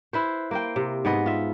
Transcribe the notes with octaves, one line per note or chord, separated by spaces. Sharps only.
E4 B4 C5
A#3 C5 G5
C3
G#2 B3 D#5
F4 E5